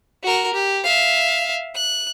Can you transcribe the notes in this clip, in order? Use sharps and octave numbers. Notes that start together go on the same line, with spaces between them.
F#4 A#4
G4
E5 F5
F#6